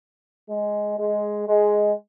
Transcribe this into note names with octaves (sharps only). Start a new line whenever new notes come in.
G#3
G#3
G#3